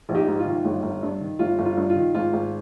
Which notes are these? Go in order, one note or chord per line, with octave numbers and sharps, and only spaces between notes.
A#1
D#4 G4
G#2
F4
D#3
G1
G1
G2
D#3
G1 F4
G1
F4
G2
F4
D#3
G#1 F4
G#1